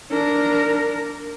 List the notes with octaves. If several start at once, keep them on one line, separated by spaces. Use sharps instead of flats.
D4 A#4